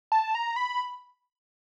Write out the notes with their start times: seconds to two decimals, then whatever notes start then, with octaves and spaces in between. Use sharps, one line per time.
0.12 A5
0.35 A#5
0.56 B5